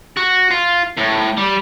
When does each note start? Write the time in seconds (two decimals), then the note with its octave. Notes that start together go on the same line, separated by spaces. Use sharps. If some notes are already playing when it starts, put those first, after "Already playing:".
0.17 F#4
0.51 F4
0.97 A2
1.37 G3